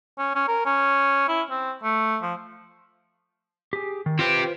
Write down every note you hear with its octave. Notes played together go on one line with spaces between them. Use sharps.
C#4
C#4
A#4
C#4
E4
C4
A3
F3
G4 G#4
D#3
C4 F4 G4 B4 C5